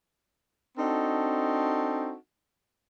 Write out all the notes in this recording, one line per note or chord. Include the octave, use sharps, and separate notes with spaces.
C4 D4 D#4 F#4 A4